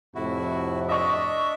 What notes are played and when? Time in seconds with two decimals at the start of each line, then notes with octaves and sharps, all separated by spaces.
0.15 F2 A2 C3 E4 F#4
0.89 D4 D#5 E5 C#6